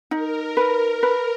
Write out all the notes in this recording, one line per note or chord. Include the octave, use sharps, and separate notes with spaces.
D#4 A#4
B4
B4